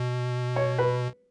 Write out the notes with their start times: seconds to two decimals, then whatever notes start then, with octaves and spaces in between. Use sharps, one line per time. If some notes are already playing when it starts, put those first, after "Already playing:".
Already playing: B2
0.56 C#5
0.78 B4